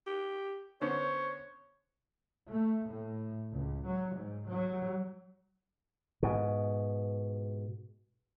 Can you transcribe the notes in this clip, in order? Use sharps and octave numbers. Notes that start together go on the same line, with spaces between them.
G4
D3 B3 C#4 C5 C#5
A3
A2
C#2
F#3
G#2
F#3
G#2 B2